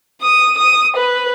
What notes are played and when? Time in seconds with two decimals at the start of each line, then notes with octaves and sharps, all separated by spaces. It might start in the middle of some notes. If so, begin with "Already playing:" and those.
0.21 D#6
0.58 D#6
0.97 B4